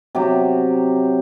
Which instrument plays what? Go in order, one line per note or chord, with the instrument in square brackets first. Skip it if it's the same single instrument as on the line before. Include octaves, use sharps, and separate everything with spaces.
[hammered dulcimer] C3 F#3 G4